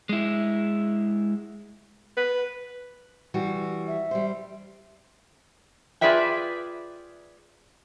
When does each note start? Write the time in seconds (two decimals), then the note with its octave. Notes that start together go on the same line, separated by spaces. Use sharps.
0.09 G#3 E4
2.17 B4
3.34 E3 G3 F#4
3.87 E5
4.11 G3 C5
6.01 F4 G#4 B4 D5 E5 G5